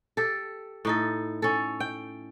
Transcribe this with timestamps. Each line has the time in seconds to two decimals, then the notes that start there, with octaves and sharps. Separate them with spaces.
0.17 G4 A4
0.85 A2 D#4 A4
1.42 C#4 A4
1.80 G5